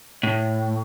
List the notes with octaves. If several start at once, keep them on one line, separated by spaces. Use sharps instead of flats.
A2